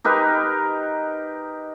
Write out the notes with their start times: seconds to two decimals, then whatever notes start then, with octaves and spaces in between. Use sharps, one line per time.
0.04 D#4 G4 A#4 B4